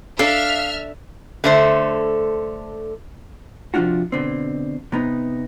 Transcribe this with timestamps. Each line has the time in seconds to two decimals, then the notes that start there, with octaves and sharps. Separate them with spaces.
0.19 D4 A4 E5 F5 F6
1.44 D3 A3 C5
3.74 C3 F3 A3 D4 F4 F#4
4.12 B2 D3 C4
4.92 C3 B3 D#4